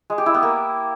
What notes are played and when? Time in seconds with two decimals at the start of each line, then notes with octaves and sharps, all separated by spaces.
0.10 G#3
0.18 G4
0.26 E4
0.34 B3
0.43 A#3